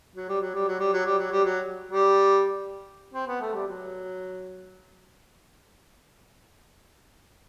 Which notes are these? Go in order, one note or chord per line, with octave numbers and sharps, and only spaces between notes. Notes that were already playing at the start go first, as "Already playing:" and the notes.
F#3
G3
F#3
G3
F#3
G3
F#3
G3
F#3
G3
F#3
G3
C4
B3
A3
G3
F#3